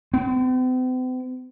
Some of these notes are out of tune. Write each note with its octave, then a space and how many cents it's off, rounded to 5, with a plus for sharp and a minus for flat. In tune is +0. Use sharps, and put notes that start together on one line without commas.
C4 -45